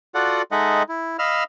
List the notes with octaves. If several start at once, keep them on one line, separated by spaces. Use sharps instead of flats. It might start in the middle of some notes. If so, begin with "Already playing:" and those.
F4 F#4 A4 D5 F#5
G#3 D#4 A4 D#5 E5 F#5
E4
D#5 F5 B5 E6 F6